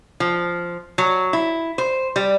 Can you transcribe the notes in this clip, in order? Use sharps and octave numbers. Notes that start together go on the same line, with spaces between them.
F3
F#3
E4
C5
G3